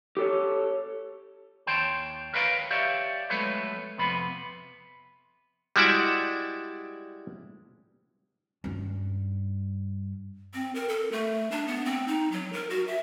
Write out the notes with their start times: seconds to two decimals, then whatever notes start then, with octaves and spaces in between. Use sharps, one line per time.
0.17 G4 A4 C#5
1.67 D#2 C#5 G5 A5 C6
2.34 A#4 B4 C#5 F5 G5 A#5
2.71 G4 C#5 D5 E5 F5
3.30 F#3 G#3 A3 B3 B4 C#5
3.98 F2 C3 B3 B5
5.76 G3 G#3 E4 F#4 D5 E5
8.64 G2 C#4
10.54 C4
10.75 A#4
10.89 A4
11.12 A3
11.51 D4
11.68 B3
11.85 C4
12.08 D#4
12.32 F#3
12.53 A#4
12.70 F#4
12.88 E5